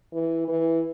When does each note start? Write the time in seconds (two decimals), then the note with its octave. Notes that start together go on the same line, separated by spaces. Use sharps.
0.13 E3
0.48 E3